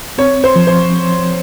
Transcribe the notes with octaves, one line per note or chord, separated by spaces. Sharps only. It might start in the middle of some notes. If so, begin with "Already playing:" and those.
C4 C#5
C5
F3
C5